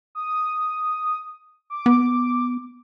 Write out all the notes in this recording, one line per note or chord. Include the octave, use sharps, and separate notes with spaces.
D#6
D6
B3